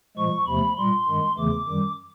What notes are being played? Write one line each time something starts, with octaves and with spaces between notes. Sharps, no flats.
A#2 F3 G#3 C#6
E2 C3 F3 A3 B5
A#2 G3 C6
G2 D#3 G#3
E2 C#3 E3 A3 D6
F#2 D#3 G3